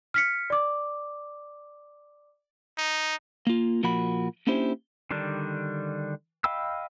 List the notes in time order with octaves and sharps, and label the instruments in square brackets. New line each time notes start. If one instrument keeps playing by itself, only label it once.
[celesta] F6 B6 C#7
D5 D6
[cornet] D#4
[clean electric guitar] A#3 F4
A#2 F3 A#3 F#4 B5
A#3 C#4 D4 E4 G4 C5
[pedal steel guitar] D3 D#3 G3 D4
D#5 F5 G5 B5 E6